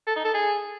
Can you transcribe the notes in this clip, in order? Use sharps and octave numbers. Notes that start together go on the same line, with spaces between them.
A4
D#4
A4
G#4